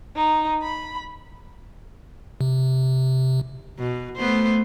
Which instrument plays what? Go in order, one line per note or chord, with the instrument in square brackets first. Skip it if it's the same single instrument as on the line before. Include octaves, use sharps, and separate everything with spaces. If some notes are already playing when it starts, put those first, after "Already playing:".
[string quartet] D#4
B5
[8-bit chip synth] C3
[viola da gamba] B2
A3 B3 C5